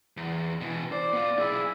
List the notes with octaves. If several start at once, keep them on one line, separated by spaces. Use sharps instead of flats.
E2
B2 E3
C5 D5
B3 F4
B1 E4 G#4